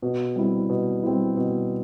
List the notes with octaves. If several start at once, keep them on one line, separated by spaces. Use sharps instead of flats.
B2
G3 C4 E4
B2
G3 C4 E4
B2